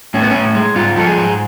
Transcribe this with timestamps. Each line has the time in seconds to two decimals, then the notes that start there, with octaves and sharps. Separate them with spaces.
0.14 A2 C#4
0.22 B3
0.30 A2 C#4
0.55 G#3
0.76 G#2 F4
0.96 F3 A4
1.06 G#4
1.17 G#2